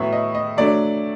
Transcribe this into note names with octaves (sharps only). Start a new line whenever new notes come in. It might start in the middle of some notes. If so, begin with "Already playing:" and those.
Already playing: A2 F#3 B3 E5
D#5
D#5
F#3 A3 D4 D5